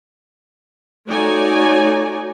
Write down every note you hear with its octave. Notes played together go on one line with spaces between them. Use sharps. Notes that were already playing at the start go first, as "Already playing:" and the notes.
A3 D#4 F#4 C#5 D5 G#5